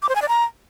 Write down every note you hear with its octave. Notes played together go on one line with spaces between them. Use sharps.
D6
C5
G#5
D5
A#5